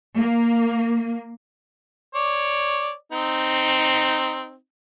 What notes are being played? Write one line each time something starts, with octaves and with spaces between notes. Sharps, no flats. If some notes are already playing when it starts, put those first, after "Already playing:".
A#3
C#5 D5
C4 D#4